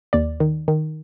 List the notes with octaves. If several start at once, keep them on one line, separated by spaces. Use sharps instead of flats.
D#2 D5
D#3
D#3